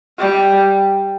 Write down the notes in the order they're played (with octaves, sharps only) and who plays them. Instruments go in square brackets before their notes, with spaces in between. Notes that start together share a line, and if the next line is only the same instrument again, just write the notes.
[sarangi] G3